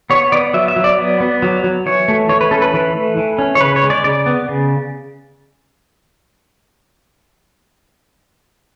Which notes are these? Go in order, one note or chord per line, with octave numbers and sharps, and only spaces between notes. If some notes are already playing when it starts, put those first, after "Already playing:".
B3 C#5
B3 D5
F#3 E5
E5
F#3
D5
B3
B3
F#3
F#3
E3 C#5
A3
E3 C#5
B4
C#4 A4
B4
E3
A3
E3
C#4
C#5
C#3 B4
C#5
G#3
D5
C#3 D5
B3
C#3